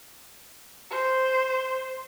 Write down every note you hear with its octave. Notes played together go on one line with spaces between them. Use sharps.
C5